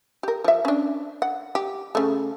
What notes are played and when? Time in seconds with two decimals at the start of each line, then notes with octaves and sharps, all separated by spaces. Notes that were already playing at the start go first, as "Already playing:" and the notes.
0.23 G4 A#4
0.44 F3 E5
0.65 C#4 D4
1.22 F#5
1.55 G4
1.95 C#3 A3